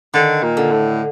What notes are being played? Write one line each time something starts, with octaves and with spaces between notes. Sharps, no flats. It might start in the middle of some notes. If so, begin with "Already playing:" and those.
D3 D#3
A#2
D3
A2